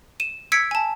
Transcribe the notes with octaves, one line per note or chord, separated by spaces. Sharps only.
D#7 E7
E6 G#6 B6 C#7 D7
G#5 A5